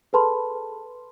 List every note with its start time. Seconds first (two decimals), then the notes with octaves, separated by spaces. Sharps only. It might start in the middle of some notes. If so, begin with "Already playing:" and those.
0.13 G#4 A4 B4 A5 B5 C6